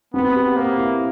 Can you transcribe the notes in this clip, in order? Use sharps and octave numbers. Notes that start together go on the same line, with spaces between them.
B3 C4
G4
A#3 C5
E4